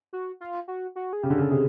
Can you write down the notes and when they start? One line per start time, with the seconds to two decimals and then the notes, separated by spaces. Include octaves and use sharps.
0.13 F#4
0.41 F4
0.68 F#4
0.96 F#4
1.13 G#4
1.23 C#3 G4
1.30 D3
1.38 C#3
1.42 A4
1.51 C3 G#4